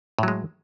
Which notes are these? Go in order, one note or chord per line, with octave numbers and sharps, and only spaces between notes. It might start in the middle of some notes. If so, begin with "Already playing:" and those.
A2 F#3 G#3